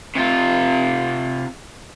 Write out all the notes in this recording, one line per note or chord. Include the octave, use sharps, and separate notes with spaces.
C3 F4